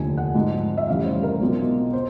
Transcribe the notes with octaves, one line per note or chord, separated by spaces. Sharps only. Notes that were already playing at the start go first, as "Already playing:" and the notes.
Already playing: F1 D#2 D3 F3 G#5
F#5
G#2 F3 G#3 C4 D#4
E5
F1 F2 C#3 E3 G3 F5
C5
A#4
B1 B2 G#3 C4 F4
C5